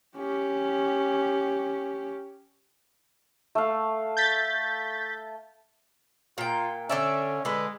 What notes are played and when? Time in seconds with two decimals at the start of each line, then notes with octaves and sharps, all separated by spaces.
0.16 C#4 G4
3.55 A3 F5
4.17 G6 A6 B6
6.38 A#2 F4 G5
6.89 D3 C#4 D5 E5
7.45 D3 G#3 B4